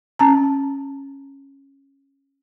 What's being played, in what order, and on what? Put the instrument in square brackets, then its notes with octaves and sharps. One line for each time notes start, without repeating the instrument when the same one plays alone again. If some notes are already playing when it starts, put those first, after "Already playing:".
[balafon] C#4 A5 A#5